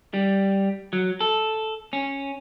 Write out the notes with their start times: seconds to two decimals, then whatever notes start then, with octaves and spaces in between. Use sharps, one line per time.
0.14 G3
0.93 F#3
1.21 A4
1.93 C#4